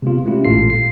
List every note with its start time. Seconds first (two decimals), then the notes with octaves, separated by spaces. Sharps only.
0.02 C3 G#3 B3 F4
0.25 G#3 A3 C#4 E4 F4 G4
0.45 A1 A#2 F4 A4 C7
0.70 C7